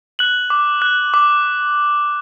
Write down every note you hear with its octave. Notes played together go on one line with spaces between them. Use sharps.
F#6 F#7
D6
F#6
D6